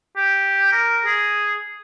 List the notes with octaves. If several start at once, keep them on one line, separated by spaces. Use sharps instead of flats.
G4
A#4
G#4